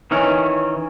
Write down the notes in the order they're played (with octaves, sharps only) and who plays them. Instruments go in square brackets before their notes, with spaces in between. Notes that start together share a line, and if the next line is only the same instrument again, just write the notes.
[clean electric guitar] D#3 E3 C#4